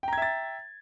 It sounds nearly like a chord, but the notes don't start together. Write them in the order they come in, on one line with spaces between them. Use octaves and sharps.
G5 A#5 G#6 E5 A6